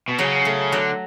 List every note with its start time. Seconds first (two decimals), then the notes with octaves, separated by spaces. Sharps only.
0.08 B2
0.18 C#3 F#3
0.45 A3
0.72 D3 F#3